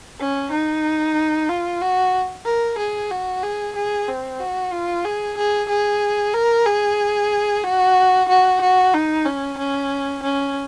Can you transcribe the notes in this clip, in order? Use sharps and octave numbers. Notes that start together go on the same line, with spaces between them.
C#4
D#4
F4
F#4
A#4
G#4
F#4
G#4
G#4
C4
F#4
F4
G#4
G#4
G#4
A#4
G#4
F#4
F#4
F#4
D#4
C#4
C#4
C#4